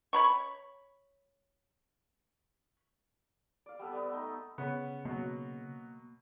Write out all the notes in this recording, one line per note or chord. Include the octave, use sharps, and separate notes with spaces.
C#5 B5 C#6
D5 F5
G3 B3 A4 B4
B3 D#5 E5
A3 D#4
C#3 B3 C#4
B2 F#3 A#3